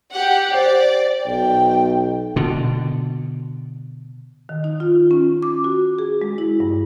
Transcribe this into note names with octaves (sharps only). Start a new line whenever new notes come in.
G4 F#5
C5 D5
B1 G5
B2 D3
D#3
D#4
F4
C#4
D6
F#4
G#4
G#3
E4
G2